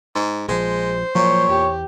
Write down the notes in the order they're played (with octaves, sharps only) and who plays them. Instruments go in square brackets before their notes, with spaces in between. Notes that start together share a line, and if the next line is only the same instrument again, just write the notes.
[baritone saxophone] G#2
[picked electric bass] A#1 F3 [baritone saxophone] G#3 [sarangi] C5
[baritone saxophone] A#2 [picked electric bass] F3 F#3 [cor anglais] C#5
[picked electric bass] E2 [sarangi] G4